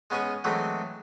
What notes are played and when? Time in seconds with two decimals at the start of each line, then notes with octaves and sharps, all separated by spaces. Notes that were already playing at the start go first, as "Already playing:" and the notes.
0.10 G#3 B3 C#4 G#4 G#5
0.44 E3 F#3 G#3 A3 C4